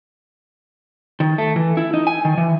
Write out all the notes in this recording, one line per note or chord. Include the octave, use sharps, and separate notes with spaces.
D#3
A3
E3
E4
D#4
G#5
D#3
E3